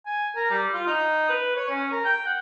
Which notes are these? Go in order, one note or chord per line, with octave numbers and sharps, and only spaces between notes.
G#5
A#4
G3
F4
D#4
B4
C#5
C#4
A#4
G5
F#5